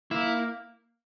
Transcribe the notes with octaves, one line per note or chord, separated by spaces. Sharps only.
A#3 E4